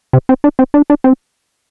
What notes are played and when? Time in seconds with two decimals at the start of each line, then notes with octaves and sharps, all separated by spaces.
0.13 C3
0.29 C4
0.44 D4
0.59 C4
0.74 D4
0.90 D4
1.04 C4